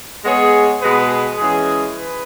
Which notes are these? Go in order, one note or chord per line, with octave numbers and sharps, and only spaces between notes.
G#3 B3 G#4 C#5
B2 G#3 B3 G#4 B4
E3 G#3 C#4 G#4
B4